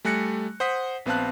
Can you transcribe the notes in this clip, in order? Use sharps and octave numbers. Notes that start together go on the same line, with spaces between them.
G3 A3 G#5 F#6 A#6 C#7
C5 F#5 D#6 B6
A#1 B3 C4 F5 A5 F#6